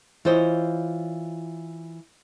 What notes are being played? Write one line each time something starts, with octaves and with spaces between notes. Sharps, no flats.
E3 F4 C5 C#5 D#5